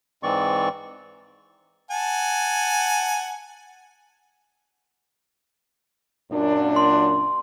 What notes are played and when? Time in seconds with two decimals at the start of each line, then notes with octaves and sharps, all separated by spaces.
0.23 G#2 E3 C4 D5 C#6
1.91 F#5 G#5 A5
6.31 F#2 A#2 D4
6.76 C6